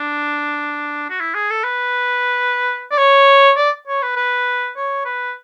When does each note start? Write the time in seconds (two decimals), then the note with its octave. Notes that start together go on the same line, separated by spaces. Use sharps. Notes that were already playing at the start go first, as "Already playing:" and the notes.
Already playing: D4
1.10 F#4
1.20 E4
1.34 G#4
1.50 A4
1.64 B4
2.91 D5
2.98 C#5
3.57 D5
3.87 C#5
4.02 B4
4.16 B4
4.76 C#5
5.05 B4